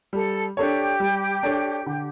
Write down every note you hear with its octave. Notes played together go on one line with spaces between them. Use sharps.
G3 A4
D4 G4 A4 C#5
G3
D4 A4 C#5
D3